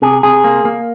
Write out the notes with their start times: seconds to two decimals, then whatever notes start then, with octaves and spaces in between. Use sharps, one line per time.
0.02 C3 G#4
0.23 C3 G#4
0.44 A#3
0.65 A#3